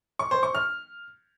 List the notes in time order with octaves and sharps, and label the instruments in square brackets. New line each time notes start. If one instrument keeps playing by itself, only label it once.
[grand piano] C#6
C5
C#6
F6